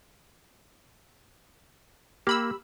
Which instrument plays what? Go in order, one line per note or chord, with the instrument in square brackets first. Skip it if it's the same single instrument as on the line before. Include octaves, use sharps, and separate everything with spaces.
[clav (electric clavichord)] A#3 [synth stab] G4 B5 E6